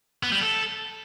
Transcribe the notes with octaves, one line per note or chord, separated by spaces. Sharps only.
B3
G3
A4